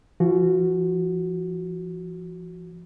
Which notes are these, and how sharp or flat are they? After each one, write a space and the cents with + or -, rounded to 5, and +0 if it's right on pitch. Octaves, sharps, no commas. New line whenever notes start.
F3 -40 F#4 +0